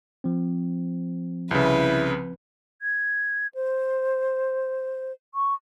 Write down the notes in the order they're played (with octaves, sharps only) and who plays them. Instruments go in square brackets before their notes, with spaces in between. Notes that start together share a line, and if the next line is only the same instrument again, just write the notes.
[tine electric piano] F3 C4
[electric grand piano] C2 C#3 [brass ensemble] E4 [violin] B4
[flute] G#6
C5
C#6